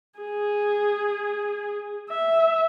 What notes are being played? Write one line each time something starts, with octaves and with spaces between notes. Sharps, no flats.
G#4
E5